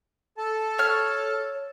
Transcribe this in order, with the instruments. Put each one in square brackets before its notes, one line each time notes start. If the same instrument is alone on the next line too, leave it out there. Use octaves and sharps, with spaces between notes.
[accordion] A4 A5
[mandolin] C#5 F6